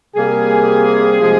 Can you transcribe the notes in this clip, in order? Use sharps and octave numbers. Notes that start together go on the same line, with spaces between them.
C3 G3 A#3 G#4
C3 F3 G#3